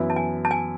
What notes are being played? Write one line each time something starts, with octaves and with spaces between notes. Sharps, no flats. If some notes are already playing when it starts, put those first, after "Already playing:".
Already playing: F#2 E3 B3 E4
A5
G#5
A5
G#5